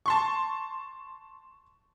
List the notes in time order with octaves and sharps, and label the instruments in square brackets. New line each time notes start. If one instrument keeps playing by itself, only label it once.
[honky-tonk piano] A5 C6 C#6